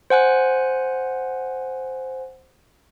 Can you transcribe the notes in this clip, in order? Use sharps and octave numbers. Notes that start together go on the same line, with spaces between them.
C5 F#5 G#5 F#6